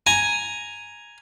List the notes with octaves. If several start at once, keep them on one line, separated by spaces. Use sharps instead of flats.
G#5 A#5